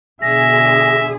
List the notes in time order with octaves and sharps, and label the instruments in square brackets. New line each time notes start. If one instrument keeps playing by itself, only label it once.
[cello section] B2 D3 G#4 [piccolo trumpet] E5 [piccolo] A#6